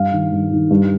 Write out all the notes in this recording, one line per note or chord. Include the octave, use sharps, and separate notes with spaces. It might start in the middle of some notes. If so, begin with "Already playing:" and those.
Already playing: G2 F5
D#3
G2
D#3
G2